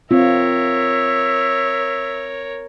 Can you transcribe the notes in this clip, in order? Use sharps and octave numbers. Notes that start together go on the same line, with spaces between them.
C4 F4 A#4 C#5 E5